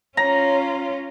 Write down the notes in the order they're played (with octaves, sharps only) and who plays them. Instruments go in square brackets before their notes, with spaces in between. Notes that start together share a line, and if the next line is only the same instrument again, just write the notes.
[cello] C#4 F4 [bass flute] C#5 [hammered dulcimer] A#5